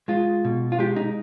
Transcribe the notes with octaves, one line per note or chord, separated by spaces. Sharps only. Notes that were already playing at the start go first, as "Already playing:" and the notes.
G#3 F4
B2
F4
G#3 G4
D#4